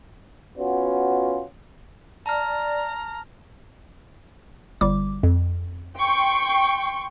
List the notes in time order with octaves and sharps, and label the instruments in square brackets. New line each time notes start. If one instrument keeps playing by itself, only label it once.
[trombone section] B3 C#4 F4 F#4
[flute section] D5 [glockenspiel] A5 F6 [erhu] A#5
[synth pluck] G1 G3 D6
F2
[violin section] G5 C6 C#6